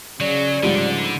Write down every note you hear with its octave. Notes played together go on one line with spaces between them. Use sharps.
C#3 F#3 D5
G#2 D3 F3 G3